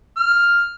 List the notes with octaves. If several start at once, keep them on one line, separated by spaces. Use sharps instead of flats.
F6